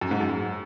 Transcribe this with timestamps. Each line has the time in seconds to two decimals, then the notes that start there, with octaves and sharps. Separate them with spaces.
0.01 F#2
0.11 G#2
0.21 F#2